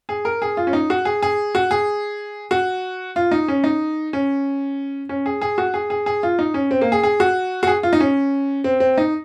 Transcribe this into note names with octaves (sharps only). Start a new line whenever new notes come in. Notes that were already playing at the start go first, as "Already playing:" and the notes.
G#4
A#4
G#4
F4
C#4
D#4
F#4
G#4
G#4
F#4
G#4
F#4
F4
D#4
C#4
D#4
C#4
C#4
G#4
G#4
F#4
G#4
G#4
G#4
F4
D#4
C#4
C4
A#3
G#4
G#4
F#4
F#4
G#4
F4
D#4
C#4
C4
C4
D#4